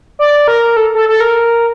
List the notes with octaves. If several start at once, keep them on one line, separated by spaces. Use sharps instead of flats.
D5
A#4
A4
A4
A4
A#4